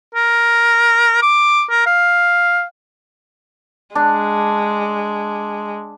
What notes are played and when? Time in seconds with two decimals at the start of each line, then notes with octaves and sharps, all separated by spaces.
0.15 A#4
1.23 D6
1.70 A#4
1.86 F5
3.95 G#3 D4